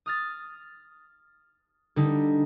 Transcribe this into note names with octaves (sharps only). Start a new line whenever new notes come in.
D#6 F6 A6
D3 G3 D#4